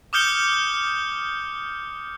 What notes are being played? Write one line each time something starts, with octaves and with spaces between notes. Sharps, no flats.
D6 D#6 F6 G6 C#7 G7